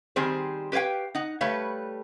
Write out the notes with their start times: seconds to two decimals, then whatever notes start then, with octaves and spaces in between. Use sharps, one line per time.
0.16 D#3 G3 C4 G#4 C5
0.72 G4 B4 C#5 F5 G5
1.15 D#4 F#5
1.41 G3 A3 B4 C#5 F5